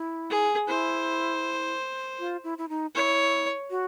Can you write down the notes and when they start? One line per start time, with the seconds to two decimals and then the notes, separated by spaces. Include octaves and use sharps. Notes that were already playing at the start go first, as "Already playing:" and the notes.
Already playing: E4
0.30 G#4
0.67 E4 C5
2.19 F4
2.44 E4
2.58 E4
2.69 D#4
2.95 E4 C#5
3.70 F#4